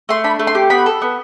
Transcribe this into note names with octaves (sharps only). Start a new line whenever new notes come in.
A3 C6
D4 B5
A3
C6
G4
B3 B5
A4
B3